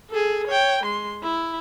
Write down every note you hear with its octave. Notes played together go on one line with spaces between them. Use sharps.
G#4 A4
C#5 G5
G#3 C6
E4